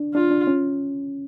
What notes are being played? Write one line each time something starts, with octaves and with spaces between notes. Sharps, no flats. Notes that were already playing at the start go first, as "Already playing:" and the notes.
Already playing: D4
D4 F4
D4
C#4